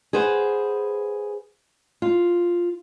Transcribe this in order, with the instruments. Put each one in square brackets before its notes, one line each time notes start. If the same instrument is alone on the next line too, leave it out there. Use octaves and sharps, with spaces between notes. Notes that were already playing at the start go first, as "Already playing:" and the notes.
[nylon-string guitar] G#4 B4 C5 F#5
F4